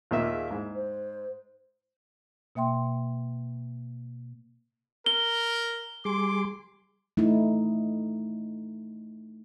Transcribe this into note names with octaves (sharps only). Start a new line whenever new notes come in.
D#2 A#2 E5
G#4
G#2 E4
C5
B2 A#3 E5 G5 C6
A#4 G7
G3 G#4 C6 D6
A3 D#4 E4